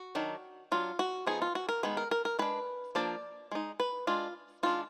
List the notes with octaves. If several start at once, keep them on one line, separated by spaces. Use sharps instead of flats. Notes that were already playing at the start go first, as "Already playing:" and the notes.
Already playing: F#4
D#3 F#3 D4
F#3 D4 F4
F#4
F3 B3 D#4 G#4
F4
F#4
A#4
D#3 G#3 B3 B4
A#4
A#4
A#4
G#3 D4 B4
F3 A#3 D4 D5
G#3 D#4
B4
G#3 D4 F4
D#3 G#3 D4 F4